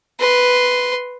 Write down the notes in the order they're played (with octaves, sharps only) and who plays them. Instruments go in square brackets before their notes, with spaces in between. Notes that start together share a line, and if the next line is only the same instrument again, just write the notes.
[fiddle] B4 C6